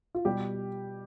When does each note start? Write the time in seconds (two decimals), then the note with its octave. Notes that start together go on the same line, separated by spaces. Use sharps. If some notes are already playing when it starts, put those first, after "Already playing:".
0.15 F4
0.25 B2 G3 G4